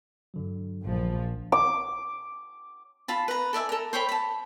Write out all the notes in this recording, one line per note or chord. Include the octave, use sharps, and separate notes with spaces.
G2 D3 F#3
A#1 F3
D6
F4 A5 B5
B4 A#5
A4 D5 E5 G#5
A4 A#4
C5 C#5 G5 B5
A5 B5